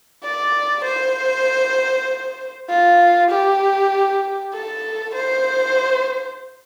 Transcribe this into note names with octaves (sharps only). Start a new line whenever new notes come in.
D5
C5
F4
G4
A4
C5